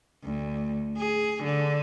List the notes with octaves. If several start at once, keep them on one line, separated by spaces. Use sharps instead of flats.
D2
G#4
D3